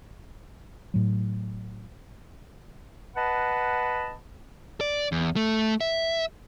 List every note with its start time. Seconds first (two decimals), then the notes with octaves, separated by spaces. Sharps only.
0.94 A2 F#3
3.16 B4 D#5 F#5 A5 B5
4.81 D5
5.12 E2
5.36 A3
5.81 E5